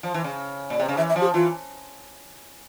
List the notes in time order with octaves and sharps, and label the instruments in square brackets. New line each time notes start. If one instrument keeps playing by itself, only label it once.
[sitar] F3
E3
C#3
A#2
C3
C#3
[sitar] E3 [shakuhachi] E5
[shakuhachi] E5
[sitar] F3
[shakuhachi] G4
[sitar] E3 [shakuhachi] F4